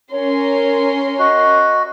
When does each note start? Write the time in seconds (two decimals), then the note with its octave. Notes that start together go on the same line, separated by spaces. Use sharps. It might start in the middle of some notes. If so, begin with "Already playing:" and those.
0.12 C#4 A#4 C#5 C6
1.19 F#4 D#5